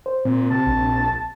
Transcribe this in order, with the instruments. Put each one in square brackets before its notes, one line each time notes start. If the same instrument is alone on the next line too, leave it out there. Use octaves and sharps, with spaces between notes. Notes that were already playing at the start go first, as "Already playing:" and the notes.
[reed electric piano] C5
[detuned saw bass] A#2 [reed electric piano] C4
[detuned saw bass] C3 [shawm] A5
[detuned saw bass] A#1